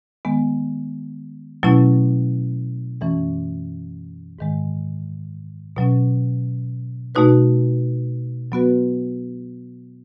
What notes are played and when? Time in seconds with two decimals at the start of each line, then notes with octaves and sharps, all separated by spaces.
0.25 D#3 G#3 B3
1.63 B2 F#3 A3 C#4 E4
3.01 F#2 E3 A3 C#4
4.39 G#2 D#3 G#3
5.76 B2 F#3 C#4
7.15 B2 A3 D#4 F#4 B4
8.52 F#3 B3 F#4 B4